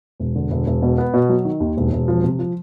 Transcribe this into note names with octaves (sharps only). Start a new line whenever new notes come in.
E1
D3
E1
E1
B2
B3
B2
F#3
D#3
D#2
E1
E1
F3
C3
F3